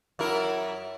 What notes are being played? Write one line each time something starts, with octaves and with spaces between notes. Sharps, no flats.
F#2 E4 A#4